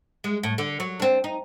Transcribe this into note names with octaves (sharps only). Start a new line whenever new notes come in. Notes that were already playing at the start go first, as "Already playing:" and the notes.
G#3
A2
D3
F#3
C4 D4
D#4